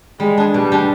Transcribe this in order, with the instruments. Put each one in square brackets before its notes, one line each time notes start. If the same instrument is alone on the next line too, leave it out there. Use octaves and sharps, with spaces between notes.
[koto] G3 [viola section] G#3
[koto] D4 G#4
[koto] B2 [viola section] G3
[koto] G#3 B3 D4 G4